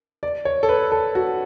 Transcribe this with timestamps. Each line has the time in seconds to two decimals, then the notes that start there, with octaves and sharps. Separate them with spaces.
0.23 D5
0.45 C#5
0.63 A4
0.69 B4
0.92 A4
1.15 F#4